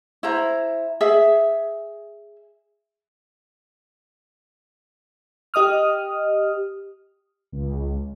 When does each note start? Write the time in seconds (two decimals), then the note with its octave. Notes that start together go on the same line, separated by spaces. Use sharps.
0.23 E4 C5 A#5
1.01 G#4 E5
5.54 G4 D#5 D#6 F6
7.52 C#2